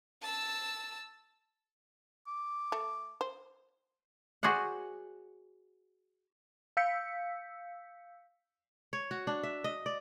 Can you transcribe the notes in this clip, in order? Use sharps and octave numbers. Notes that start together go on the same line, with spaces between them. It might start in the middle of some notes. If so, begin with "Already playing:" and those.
A5 E6
D6
A3
C5
F#4 G#4 C5 D5 F#5
F5 E6 G6 B6 C#7
C#5
F#4
D4
E5
D#5
D5